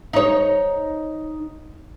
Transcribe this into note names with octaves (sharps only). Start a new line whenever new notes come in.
D#4 C#5